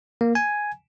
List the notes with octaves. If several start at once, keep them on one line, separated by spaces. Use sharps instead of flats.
A#3
G#5